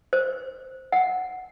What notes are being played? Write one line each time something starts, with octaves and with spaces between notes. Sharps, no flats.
C5
F#5